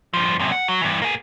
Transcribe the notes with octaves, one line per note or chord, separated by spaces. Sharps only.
G2 F3
F#2 C3
F#5
F#3
G2 E3
A#3 G#4